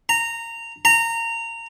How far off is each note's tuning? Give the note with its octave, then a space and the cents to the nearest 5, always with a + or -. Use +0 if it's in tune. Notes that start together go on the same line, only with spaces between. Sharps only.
A#5 -15
A#5 -20